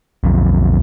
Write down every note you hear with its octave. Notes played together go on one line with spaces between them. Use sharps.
B1 F2